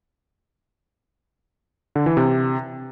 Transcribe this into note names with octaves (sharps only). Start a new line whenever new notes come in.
D3
E3
C3